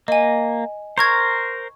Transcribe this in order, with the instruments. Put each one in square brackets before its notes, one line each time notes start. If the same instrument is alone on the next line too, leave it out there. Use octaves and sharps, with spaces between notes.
[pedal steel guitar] A#3 [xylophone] D#5 G#5
[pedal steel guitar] A#4 C5 [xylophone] A#5 C#6 G#6